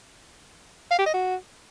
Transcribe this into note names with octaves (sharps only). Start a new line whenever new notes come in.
F5
G4
D#5
F#4